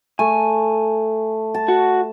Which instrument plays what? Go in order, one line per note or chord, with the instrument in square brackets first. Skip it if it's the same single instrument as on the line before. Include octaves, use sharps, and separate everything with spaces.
[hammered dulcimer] A3 [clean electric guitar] G#5
[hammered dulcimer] A5
[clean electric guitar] F#4 F#5